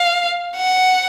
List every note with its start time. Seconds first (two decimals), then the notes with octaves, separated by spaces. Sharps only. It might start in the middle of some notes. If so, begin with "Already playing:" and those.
Already playing: F5
0.56 F#5